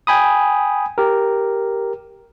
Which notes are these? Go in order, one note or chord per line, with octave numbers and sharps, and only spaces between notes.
G5 G#5 B5 D#6
G4 A#4